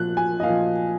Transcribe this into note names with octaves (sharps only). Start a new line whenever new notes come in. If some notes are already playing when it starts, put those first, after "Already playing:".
Already playing: A#2 F3 F#6
G#5
D#5
A#2 F3 F5